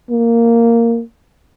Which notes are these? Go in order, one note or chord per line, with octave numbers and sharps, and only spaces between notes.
A#3